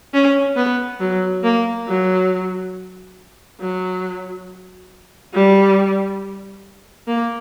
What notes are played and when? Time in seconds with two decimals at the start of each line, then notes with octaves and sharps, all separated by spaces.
0.14 C#4
0.56 B3
1.00 F#3
1.44 A#3
1.88 F#3
3.61 F#3
5.34 G3
7.08 A#3